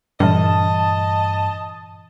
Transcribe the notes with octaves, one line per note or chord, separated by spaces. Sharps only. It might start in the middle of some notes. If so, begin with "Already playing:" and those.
G2 A#2 E3 D#5 A5